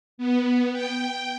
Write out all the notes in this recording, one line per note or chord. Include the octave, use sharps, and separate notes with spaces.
B3
G5